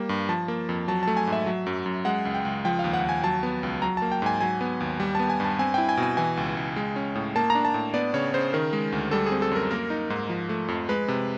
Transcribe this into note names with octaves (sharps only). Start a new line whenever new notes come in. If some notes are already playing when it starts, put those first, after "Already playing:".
Already playing: G3 A#3
G2
F3 A5
A#3
F2
F#3 A5
A3 A5
G#5
G#2
E5
F#3
F#2
F#2
G#3 F#5
C#2
G5
C#2
F3 G5
D#2 F5
F#5
D#2
G#5
F#3 A5
B3
C#2
F#3 A#5
A#3 A5
G5
G#2 G#5
F#3 G#5
B3
D#2
G3
B3 A5
G#5
G2 A5
C4 G#5
E4 G5
G#5
B2
G#5
E3 G#5
C#2
C#2
G#3
C#4
A2
A#3 A5
A#5
D4
A5
A2
B3 D5
C#3 C#5
C#3 C5
D#3 A#4
G#3
D2
G3 A4
G#4
C4
A4
F#2 A#4
A#3 A#4
D#4
G#2
F3
A3
F2
G#3 B4
C3